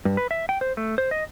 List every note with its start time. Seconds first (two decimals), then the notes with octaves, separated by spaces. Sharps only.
0.05 G2
0.17 B4
0.31 E5
0.49 G5
0.61 C5
0.77 A3
0.98 C5
1.11 D#5